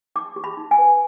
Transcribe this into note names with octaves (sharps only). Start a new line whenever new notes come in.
D#4 D6
G4
B5
D#4
G#5
B4